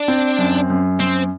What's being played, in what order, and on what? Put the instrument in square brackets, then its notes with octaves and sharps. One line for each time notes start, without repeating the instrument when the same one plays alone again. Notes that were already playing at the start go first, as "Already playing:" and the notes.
Already playing: [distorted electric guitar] D4
[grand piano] C4
F#2
F#2
[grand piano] F#2 [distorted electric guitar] C4